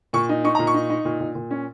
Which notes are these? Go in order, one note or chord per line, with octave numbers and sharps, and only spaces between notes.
A#2 C#6
D#4
D#4 C#6
A#2 A#5
C#6
D#4
D#4
A#2
A#2
A#2
C#4